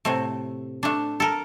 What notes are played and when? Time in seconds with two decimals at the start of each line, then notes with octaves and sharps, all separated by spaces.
0.05 A2 C3 A3
0.83 A3 D4
1.20 A4 A#4